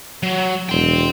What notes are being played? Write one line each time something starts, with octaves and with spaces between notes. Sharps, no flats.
F#3
E1 G5 C6